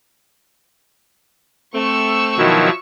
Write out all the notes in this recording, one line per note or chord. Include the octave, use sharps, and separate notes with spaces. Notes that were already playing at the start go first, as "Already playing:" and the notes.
A3 C4 C#6 E6
B2 D#3 F3 F#3 E4